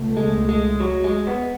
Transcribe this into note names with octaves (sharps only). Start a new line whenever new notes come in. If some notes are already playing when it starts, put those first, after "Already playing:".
Already playing: C#2 B2 A3
G#3
G#3
F#3
G#3
B3